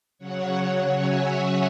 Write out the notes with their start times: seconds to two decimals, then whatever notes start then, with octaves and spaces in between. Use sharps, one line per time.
0.18 C#3 F#3 C#5 F#5
0.99 E5 G#5